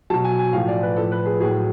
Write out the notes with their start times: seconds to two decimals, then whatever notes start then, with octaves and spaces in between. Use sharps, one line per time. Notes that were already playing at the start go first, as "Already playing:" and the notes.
0.10 F#3 A5
0.14 B2
0.24 G#5
0.39 G#5
0.53 A2 F3 F5
0.68 D5
0.83 B4
0.97 A2 F3 A4
1.12 B4
1.26 G#4
1.40 A2 F#3 G#4